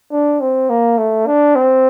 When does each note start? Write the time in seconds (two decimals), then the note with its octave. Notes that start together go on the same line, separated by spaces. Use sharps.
0.12 D4
0.40 C4
0.69 A#3
0.98 A3
1.26 D4
1.55 C4